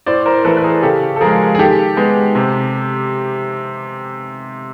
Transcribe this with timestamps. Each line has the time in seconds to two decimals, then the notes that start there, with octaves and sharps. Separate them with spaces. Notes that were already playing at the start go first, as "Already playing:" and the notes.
0.06 A2 C5 D5
0.26 A#4 C5
0.45 E3 A3 A4 B4
0.57 B4
0.64 G#4 A#4
0.83 C#3 G4 A4
1.16 A4
1.21 F3 G#3 G#4 A#4
1.55 G#4
1.58 D#3 G4 A4
1.97 G#3 B3
2.35 C3